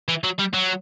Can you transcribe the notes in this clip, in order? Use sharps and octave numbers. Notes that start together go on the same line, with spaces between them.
E3
F#3
G3
F#3